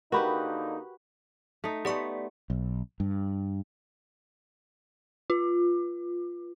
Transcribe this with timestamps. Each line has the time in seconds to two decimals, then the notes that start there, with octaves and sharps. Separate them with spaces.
0.12 D3 A#3 D#4 F#4 G4 A#4 B4 B5
1.64 A3 D#4
1.85 A3 B3 G4 D5 C#6
2.50 B1
3.00 G2
5.30 F4